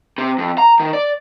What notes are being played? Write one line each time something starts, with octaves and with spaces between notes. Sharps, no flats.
C3
F2
A#5
D#3
D5